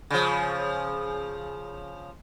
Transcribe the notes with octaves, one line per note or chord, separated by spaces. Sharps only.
C#3 F3